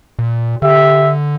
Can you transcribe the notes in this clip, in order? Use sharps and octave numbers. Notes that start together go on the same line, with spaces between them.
A#2
D3 G4 E5